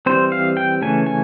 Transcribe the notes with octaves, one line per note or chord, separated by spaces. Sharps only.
E3 G3 C4 C5
F5
G5
C#3 E3 A3 C#4 G#5
G#5